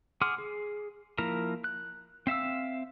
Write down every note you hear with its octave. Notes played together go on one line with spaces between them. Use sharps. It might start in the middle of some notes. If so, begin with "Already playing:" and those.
G#4 F#5 C6 D6 F6
G#4
F3 A#3 E4 A#4 A#5
F#6
C4 E5 F5 E6